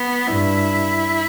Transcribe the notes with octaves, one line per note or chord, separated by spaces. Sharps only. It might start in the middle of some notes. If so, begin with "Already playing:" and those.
Already playing: B3
G2 E4